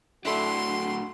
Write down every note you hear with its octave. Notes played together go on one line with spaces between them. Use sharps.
A2 D4 E4 F#4 A4 C6